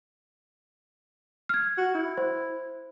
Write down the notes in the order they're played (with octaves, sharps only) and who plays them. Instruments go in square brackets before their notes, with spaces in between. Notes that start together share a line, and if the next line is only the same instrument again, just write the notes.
[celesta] F6 G#6
[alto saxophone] F#4
E4
[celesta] C5